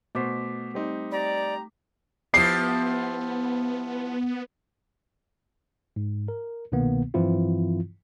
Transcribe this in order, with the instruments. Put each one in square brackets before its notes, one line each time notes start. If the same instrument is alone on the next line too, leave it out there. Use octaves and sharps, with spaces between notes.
[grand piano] B2 C5 [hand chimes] A3 D6 B6
[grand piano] G3 C4 D#4
[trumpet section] G4 A#5 [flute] D5
[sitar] F3 E4 G4 [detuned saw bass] B3 [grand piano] C7
[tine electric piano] G#2
A#4
C2 B2 D#3 A#3 B3
G2 E3 F3 C4 E4 F4